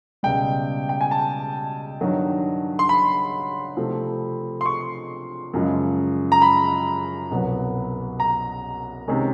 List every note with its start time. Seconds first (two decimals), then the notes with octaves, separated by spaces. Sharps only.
0.23 C#2 B2 G3 G5
0.89 G5
1.01 G#5
1.11 A5
2.01 G2 D#3 F#3
2.79 C6
2.89 B5
3.77 C3 F3 A3 C4
4.61 C6
4.66 C#6
5.54 F#2 C#3 F3 G#3
6.32 A#5
6.42 B5
7.31 C2 B2 F#3 B3
8.20 A#5
9.08 C3 D#3 G#3 C#4